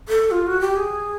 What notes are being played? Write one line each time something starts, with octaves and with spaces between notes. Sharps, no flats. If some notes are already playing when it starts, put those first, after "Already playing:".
A4
F4
F#4
G4
G#4